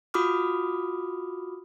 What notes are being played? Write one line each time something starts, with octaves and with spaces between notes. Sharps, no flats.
F4 F#4 B5 D6 D#6 F6